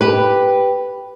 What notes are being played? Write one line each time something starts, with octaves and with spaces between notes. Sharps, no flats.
G4 B4